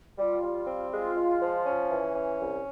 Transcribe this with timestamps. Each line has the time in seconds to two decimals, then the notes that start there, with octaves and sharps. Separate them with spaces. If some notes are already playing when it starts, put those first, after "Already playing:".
0.18 G3 F4
0.42 G3
0.67 C4
0.92 G#3 F4
1.16 G#3
1.41 F3
1.65 C#4
1.91 E3
2.15 C#4
2.40 C2